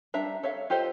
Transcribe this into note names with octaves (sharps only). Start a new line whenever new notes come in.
G3 D4 E5 A#5
A4 C#5 E5 F5
F4 G4 A4 C5 D#5